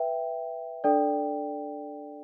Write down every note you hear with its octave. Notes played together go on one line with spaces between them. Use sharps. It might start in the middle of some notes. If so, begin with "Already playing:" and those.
Already playing: B4 E5 G5
D4 A4 D5 G5